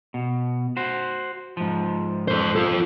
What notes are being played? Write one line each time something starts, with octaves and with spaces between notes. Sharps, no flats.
B2
F#4 C5
G#2 F3
A4 C5
F4 A4